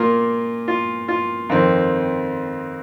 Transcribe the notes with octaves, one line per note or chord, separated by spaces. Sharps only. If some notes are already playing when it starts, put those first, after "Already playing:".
Already playing: A#2 A#3 F4
F4
F4
F2 D#3 C4